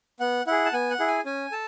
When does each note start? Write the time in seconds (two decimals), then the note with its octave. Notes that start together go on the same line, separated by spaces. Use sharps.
0.20 B3 F#5
0.47 E4 G#4 F#5
0.65 A5
0.73 B3 G#5
0.90 F#5
1.00 E4 G#4
1.08 G#5
1.25 C#4 G#5
1.52 A4 A5